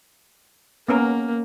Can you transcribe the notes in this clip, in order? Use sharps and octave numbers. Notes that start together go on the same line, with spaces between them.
A#3 B3 C#4 A#4